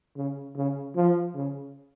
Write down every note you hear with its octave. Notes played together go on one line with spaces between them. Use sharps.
C#3
C#3
F3
C#3